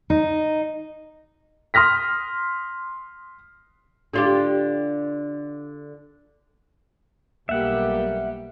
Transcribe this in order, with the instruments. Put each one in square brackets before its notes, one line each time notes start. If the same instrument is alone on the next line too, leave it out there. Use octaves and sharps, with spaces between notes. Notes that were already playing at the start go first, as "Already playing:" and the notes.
[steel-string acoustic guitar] D#4
[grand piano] C6 D#6 F6 A#6 B6
[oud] D3 F4 G4
[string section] B1 G3 G4 [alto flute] A#3 [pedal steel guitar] E5 F#5